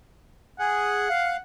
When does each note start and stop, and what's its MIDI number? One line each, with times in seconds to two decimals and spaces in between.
0.59 1.09 68
0.59 1.42 78
1.09 1.37 77